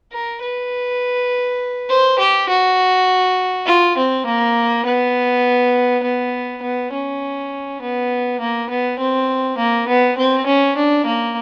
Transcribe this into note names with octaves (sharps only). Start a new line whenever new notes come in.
A#4
B4
C5
G4
F#4
F4
C4
A#3
B3
B3
B3
C#4
B3
A#3
B3
C4
A#3
B3
C4
C#4
D4
A#3